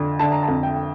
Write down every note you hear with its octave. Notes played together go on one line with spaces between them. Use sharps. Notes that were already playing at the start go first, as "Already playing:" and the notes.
Already playing: F2 D3
D3 A5
A#5
A5
F2
G5